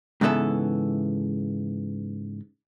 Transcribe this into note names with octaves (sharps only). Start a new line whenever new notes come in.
G#2 C#3 E3 B3 A4 E5